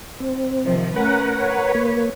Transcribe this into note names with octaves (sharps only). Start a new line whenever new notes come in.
C4
C3 D#3 F3
A3 C#4 A#4 B4 F#5
B4 C#5
A#3